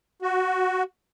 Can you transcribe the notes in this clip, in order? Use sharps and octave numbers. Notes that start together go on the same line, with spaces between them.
F#4